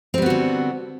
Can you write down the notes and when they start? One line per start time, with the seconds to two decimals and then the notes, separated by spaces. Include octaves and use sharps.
0.14 C4
0.18 G3
0.22 B3
0.26 F#4
0.30 D3